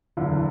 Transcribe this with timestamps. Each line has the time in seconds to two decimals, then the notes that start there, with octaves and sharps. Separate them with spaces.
0.17 F#1 E2 D3